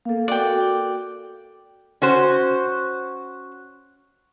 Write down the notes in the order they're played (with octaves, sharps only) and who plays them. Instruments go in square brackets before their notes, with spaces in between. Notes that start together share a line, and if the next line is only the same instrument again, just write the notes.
[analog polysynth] A#3 [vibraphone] A4 F5
[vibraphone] F#4 A4 [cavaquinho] D5 G5
[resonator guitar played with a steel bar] C#4 F#4 C5